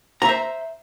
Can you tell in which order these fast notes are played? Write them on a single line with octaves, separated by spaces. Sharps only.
A#5 E5 C5